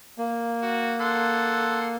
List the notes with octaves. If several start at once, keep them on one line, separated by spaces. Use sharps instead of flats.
A#3
F#4
A4 F#5 C6